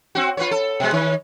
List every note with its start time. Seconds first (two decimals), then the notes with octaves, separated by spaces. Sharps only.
0.15 C4 F#4
0.37 F4 B4 C#5
0.51 A4
0.80 B2 G#3
0.92 D#3 C#5